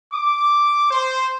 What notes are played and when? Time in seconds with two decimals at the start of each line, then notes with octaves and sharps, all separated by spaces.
0.13 D6
0.91 C5